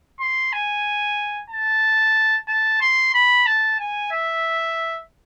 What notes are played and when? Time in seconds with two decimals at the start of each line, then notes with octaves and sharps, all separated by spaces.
0.20 C6
0.53 G#5
1.50 A5
2.48 A5
2.81 C6
3.14 B5
3.47 A5
3.80 G#5
4.11 E5